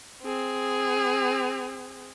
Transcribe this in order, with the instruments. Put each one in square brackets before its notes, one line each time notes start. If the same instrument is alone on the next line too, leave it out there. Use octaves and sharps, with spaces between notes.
[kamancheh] C4 G#4